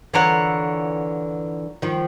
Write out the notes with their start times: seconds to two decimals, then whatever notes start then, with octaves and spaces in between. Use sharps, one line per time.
0.14 D3 E3 F4 A#4 C#5 F#5
1.82 D#3 F3